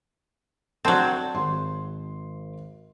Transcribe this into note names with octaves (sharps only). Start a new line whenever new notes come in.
F#3 C4 D5 A5
G#1 C6